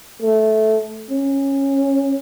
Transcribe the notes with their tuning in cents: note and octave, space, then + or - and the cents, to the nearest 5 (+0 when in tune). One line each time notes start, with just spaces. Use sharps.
A3 -10
C#4 -15